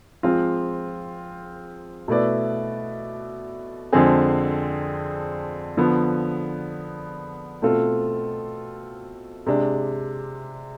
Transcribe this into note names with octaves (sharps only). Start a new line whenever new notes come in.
F3 G#3 C4 F4
B2 A3 E4 B4 D5
F2 D3 G#3 C4 G#4
D3 F3 B3
B2 A3 C4 F4 A4
C3 G#3 D4